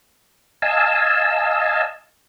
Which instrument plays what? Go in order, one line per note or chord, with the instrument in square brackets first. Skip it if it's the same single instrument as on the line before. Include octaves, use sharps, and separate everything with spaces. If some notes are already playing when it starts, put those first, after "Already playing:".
[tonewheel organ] D#5 F5 G#5 A5 E6